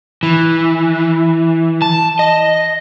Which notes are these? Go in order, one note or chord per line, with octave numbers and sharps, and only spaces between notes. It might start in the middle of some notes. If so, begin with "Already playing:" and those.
E3
A5
D#5